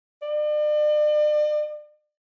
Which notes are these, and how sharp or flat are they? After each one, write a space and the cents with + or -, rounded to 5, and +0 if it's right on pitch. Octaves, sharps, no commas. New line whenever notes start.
D5 +40